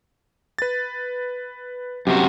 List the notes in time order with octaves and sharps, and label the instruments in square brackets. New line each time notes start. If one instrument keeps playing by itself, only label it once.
[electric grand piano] B4 A6
[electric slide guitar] F#2 C3 F#4 [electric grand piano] G4